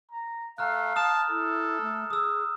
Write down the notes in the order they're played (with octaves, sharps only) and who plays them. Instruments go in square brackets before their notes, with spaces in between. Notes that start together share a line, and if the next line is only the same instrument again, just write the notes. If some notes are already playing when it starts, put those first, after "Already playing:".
[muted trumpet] A#5
[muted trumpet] A3 [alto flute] F5 [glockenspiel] A#5 F6 F#6
[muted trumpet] A5 [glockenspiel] D#6 F6 E7
[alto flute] E4 [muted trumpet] A4
[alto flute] A3
[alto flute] G#4 [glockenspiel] D#6 E6